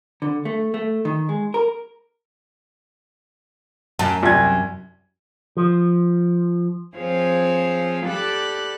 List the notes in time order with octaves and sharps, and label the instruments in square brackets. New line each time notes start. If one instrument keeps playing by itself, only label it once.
[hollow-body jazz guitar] D3
A3
A3
D#3
G#3
A#4
[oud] F#2 [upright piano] A5
[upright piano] C2 G#6
[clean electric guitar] F3
[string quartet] F3 C4 F4 G#4 C#5
G4 A4 D5 B5 F#6